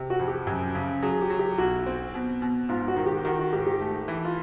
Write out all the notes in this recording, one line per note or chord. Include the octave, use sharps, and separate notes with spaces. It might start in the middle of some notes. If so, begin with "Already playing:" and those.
Already playing: C3
F#4
F2
G4
F#2
C#3
F#3 G#4
G4
F#3
G4
B1 F#4
C4
B2
B2
G#2 F4
F#4
D#3
G4
D#3 F#4
F#4
G#2 G4
G4
A3
E3
F4